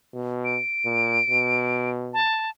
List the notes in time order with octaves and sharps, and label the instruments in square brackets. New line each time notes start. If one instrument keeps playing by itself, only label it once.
[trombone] B2
[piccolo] D7
[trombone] A#2
B2
[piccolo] A5